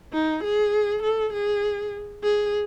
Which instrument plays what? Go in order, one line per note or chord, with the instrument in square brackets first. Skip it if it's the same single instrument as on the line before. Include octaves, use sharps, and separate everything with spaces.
[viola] D#4
G#4
A4
G#4
G#4